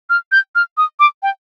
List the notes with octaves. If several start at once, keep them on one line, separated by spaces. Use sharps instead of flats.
F6
G6
F6
D#6
D6
G5